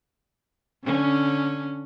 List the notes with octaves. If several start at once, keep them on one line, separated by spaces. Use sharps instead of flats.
D3 C#4